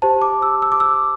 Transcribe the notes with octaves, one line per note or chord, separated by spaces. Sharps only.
G4 C5 A5
D6
E6
E6
D6
E6